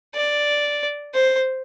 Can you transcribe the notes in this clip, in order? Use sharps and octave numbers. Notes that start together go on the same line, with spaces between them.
D5
C5